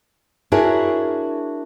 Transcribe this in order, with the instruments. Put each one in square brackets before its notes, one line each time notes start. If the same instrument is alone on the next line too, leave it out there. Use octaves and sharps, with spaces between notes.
[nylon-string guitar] D4 E4 F#4 G#4 A#4 C#5